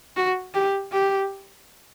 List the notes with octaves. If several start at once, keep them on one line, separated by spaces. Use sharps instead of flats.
F#4
G4
G4